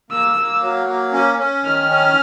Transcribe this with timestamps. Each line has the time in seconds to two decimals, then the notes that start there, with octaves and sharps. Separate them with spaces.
0.11 A#3 E6
0.36 A#3
0.62 F#3
0.87 A#3
1.13 C#4
1.38 C#4
1.64 D#3 F6
1.89 C#4